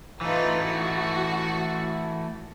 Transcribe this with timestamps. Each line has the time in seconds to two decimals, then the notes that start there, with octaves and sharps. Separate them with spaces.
0.21 E3 A3 D#4 F4 B4
0.63 F#4